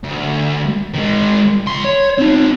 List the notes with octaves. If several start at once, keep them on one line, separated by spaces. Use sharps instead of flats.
D2
D#3 G#3
C#2 C6
C#5
C4 D#4